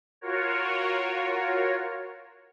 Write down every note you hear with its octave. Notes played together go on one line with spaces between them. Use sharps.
F4 F#4 A#4 C#5